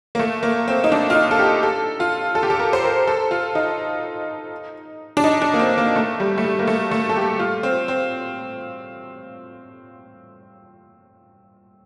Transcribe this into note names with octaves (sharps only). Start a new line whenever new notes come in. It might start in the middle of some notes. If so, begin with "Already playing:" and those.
A#3
A3
A#3
C4
D#4
D4
F4
D#4
A4
G4
A4
F4
A4
G4
A4
A#4
C5
A#4
A4
F4
D#4
D4
D#4
D4
A#3
C4
A#3
A3
G3
A3
G3
A#3
A3
A3
A4
G4
F4
C4
C4